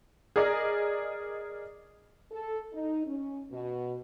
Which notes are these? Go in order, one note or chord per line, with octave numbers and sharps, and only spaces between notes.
G#4 A#4 D5 D#5
A4
D#4
C#4
B2